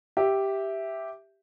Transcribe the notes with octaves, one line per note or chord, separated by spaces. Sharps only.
G4 E5